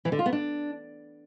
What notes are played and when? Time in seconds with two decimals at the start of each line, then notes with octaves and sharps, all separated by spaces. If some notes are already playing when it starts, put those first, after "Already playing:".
0.05 E3
0.12 D3
0.19 F4
0.26 B3
0.33 D4